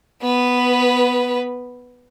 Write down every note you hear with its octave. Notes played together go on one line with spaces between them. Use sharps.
B3 B4